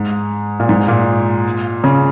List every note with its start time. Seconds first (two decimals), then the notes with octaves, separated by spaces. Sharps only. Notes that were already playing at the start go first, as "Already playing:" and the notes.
Already playing: G#2
0.60 A#2
0.69 G#2
0.88 A#2
1.84 C#3